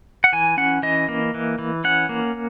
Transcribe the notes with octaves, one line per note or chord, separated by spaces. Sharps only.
F#5
E3 G#5
C#4 F#5
E3 D#5
A#3
E3
E3
C#4 F#5
A#3